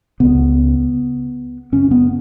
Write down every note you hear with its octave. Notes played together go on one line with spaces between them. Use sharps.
C#2 C#3 B3
F#2 C#3 C#4
B3